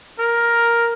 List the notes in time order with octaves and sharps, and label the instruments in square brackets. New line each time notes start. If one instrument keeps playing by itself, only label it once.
[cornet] A#4